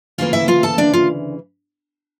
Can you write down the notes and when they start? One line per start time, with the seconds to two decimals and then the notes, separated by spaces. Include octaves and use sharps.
0.18 D2 C#3 E3 A#3 F4 F5
0.33 E4 E5
0.48 F4 F5
0.63 A4 A5
0.78 D4 D5
0.93 F4